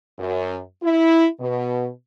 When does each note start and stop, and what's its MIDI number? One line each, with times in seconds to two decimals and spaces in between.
0.19 0.58 42
0.83 1.26 64
1.40 1.88 47